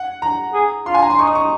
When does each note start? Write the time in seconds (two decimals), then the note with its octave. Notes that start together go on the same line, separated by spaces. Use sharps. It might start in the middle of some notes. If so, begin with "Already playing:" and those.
Already playing: F#5
0.22 A#5
0.54 G#4
0.86 F4 C6
0.94 G#5
1.02 A#5
1.10 C6
1.19 D#4 C#6
1.27 D#6
1.35 C#6